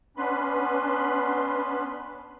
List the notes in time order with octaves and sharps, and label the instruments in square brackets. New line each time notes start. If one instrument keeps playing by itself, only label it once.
[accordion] B3 C#4 D4 B4 B5 C6